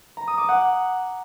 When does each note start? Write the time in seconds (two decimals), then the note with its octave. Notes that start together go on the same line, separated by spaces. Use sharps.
0.17 A#5
0.28 D#6
0.38 D6
0.49 F#5